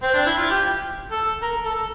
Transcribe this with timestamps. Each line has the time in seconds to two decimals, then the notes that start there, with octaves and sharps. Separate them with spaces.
0.02 C4
0.14 D4
0.26 E4
0.38 F4
0.50 G4
1.11 A4
1.42 A#4
1.65 A4